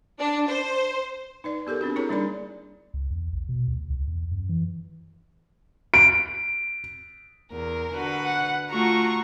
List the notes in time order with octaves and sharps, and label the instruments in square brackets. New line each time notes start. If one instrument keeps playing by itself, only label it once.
[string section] D4
C5
[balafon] D#4 B4 D5
B3 G4 A4 A#4
B3 C4 D4 F#4
E4 G#4 A#4 C#5 A#5
G3 A#3 D4 D#4 A#4 D5
[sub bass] C#2
E2
A#1
B2
D2
C#2
E2
F#2
E3
[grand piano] D7
[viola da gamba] E2 [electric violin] A#4
[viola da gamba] D3 F#4 B4
[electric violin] F#5
[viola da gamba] A3 F4 F#4 [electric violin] A#5 C#6